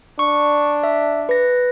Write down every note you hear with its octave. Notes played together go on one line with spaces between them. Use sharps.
D4 C#6
E5
B4 A#6